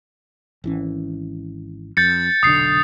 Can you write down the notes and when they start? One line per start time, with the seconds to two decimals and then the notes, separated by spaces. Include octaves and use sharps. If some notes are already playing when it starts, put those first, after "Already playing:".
0.64 G#1 E3 C#4
1.97 F2 G6 A6 C#7
2.43 F1 B1 D3 D#6 C7